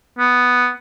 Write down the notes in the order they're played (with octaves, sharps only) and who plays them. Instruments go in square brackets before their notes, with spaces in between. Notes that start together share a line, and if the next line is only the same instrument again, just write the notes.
[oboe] B3